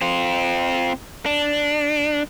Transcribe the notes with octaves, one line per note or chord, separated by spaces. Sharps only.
C4 F4
D4